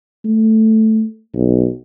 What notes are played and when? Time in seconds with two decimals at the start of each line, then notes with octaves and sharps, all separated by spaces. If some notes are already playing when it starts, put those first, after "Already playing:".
0.25 A3
1.35 B1